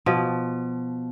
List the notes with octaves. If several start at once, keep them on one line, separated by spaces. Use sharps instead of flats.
B2 F3